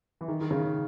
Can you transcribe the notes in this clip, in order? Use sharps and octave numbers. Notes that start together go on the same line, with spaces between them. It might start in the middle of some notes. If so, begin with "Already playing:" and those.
E3
D#3
D#3
C#3